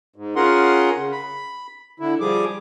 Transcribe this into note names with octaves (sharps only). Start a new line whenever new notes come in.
G#2
C#4 F4 G#4 A#4 F#5 C6
C#3
B5
D3 E4
F3 G3 G#4 D6